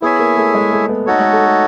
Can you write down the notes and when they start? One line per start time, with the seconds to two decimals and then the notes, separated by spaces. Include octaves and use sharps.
0.02 B3 E4 G#4 C#5 E5 G#5
0.19 A#3
0.37 A3
0.55 G#3
0.72 A3
0.89 B3
1.06 A3 D#4 F#4 A4 C#5
1.19 G#3
1.33 A3
1.45 A3